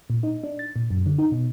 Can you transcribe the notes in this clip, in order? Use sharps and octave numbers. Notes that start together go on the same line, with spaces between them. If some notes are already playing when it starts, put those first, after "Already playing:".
A#2
D#4
D4
A6
A#2
F#2
D3
D#4
B2